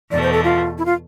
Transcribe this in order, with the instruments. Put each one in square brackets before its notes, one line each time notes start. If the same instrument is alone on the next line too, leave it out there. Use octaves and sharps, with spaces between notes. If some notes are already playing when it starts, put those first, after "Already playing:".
[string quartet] E2 B2 A3 [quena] D5
[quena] C5
A4
F4
E4
F4